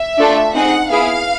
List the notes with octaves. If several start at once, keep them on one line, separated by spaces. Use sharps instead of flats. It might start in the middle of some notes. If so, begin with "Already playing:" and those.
Already playing: E5
A3 D4 F4 A4
C4 D#4 G#4 F#5
B3 E4 G#4 F5